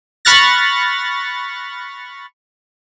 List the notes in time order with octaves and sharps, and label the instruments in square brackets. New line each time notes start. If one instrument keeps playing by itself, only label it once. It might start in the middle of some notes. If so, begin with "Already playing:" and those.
[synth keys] B5 C#6 F6 F#6 A6 A#6